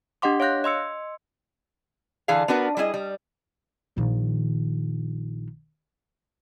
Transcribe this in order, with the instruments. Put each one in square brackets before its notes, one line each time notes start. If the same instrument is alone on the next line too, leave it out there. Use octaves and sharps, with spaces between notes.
[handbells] D4 G4 D#5 F#5 C6 D6
C#5 F5 C6 F#6 G6 A#6
D#5 C6 E6 C#7
[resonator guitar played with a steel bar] D3 E3 D4 G#4 F5
B3 D4 F#4 A#4 B4
G3 E4 G#4 D#5
G3
[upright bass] A#1 D#3